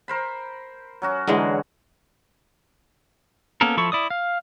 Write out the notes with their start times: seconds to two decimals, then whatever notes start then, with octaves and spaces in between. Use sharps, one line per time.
0.08 A#4 C5 B5
1.02 F#3 C#4 F#4
1.27 D3 E3 F#3 G#3
3.61 A#3 B3 C#4 A4 A#4
3.77 F3 E4 A4 C#6
3.92 E4 D5 D#6
4.10 F5